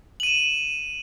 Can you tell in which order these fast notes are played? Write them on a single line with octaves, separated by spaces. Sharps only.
F#7 D#7 E7